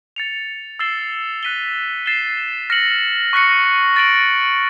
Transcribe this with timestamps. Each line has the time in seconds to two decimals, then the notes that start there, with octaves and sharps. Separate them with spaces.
0.16 A6 C#7 F7
0.79 E6 A6 C7 E7 G7
1.43 F#6 B6 D#7 G7
2.06 A6 C7 E7 G7
2.70 F6 A#6 C#7 F#7
3.33 C#6 F#6 A#6 C#7
3.96 A6 D7 F#7